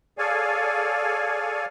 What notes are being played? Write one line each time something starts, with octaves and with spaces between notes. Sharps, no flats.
G#4 A4 C#5 D5 F5 G#5